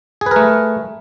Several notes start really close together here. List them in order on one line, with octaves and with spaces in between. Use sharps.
G#4 B4 A#4 A3